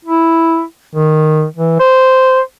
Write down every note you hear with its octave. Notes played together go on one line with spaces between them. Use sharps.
E4
D#3
E3
C5